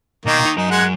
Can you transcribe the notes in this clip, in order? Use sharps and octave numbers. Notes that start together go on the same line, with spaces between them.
B2 D#3 A#3 D#5
D#4
F#3 D#4 A#4
G#3 F#5 G#5